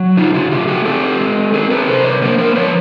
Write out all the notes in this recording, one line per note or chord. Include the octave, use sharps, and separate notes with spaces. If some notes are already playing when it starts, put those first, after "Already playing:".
Already playing: F#3
C#3 D#4 F4
E4 F#4
A3 F4 G4
F#4 G#4
C4 G4 A4
G#3
C4 G#4 A#4
A4 B4
C3 A#4 C5
B4 C#5
A#3 A#4 C5
A#4 C5
F3 B4 C#5